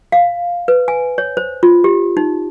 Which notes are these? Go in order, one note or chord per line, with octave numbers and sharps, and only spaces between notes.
F5
B4
G#5
C#5
C5
F4
G4
D#4